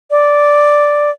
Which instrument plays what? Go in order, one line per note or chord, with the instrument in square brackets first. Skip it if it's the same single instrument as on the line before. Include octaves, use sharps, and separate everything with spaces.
[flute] D5